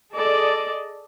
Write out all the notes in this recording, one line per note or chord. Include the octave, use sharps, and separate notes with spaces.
G#4 A4 D5 D#5